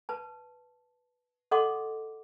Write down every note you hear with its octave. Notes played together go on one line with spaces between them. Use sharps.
B4 A5
A4 D#5 F#5 C6 D6